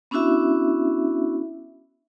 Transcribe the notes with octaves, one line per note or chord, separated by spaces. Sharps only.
B3 C#4 D4 E4 F#4 E5